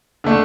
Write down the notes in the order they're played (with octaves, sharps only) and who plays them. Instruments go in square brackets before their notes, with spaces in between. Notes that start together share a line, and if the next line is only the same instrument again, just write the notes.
[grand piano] D3 A3 D4